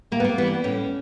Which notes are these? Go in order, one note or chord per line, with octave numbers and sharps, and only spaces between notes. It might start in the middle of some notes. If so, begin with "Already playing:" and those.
A2 A#3
B3
A#3
E3 G3 B3
A2 C#4